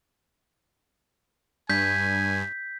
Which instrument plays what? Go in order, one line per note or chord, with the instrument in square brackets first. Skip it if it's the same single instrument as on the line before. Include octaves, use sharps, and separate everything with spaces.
[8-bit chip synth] G2 [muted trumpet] G#5 [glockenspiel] G6 B6